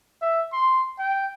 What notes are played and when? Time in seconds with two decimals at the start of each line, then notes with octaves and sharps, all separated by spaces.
0.22 E5
0.53 C6
0.99 G5